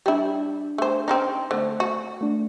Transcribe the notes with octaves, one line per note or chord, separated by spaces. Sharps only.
G3 D4 E4 G4
A3 C5
C4 C#4 D#4
D3 A3 C5
F#4
A3 D4